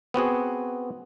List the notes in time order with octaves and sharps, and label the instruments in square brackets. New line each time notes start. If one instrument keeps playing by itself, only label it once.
[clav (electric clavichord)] B3 C4 F#4 G#4